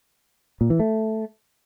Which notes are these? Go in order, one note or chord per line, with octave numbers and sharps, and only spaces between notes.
A#2
E3
A3